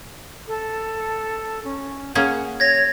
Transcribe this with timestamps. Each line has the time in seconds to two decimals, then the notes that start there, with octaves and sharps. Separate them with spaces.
0.48 A4
1.64 C#4
2.15 A#3 C#4 G#4 F#5
2.60 C#5 G#6 A#6